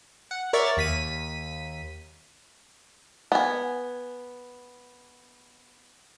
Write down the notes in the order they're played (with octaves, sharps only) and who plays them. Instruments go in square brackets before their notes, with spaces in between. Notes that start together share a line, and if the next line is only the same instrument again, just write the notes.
[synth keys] F#5
A#4 C#5 D5 E5 C#6 A6
D#2 B6 D#7
[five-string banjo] B3 G#5